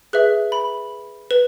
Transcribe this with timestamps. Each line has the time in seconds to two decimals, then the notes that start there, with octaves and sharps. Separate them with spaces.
0.13 G#4 B4 E5 F#6
0.52 B5
1.31 B4